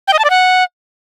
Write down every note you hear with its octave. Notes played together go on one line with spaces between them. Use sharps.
G5
D#5
A5
D5
F#5